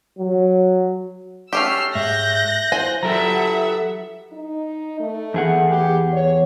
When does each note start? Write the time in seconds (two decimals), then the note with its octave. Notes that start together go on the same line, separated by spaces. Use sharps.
0.18 F#3
1.53 A3 C#4 G4 E6 F6 C7
1.95 G#2 E5 F#6 G6 A#6
2.72 E4 F4 C5 G#5
3.03 F#3 G4 A4 E5 F#5 A#5
4.32 D#4
5.00 A3
5.34 E2 G#4 F#5
5.70 G4
6.13 C#5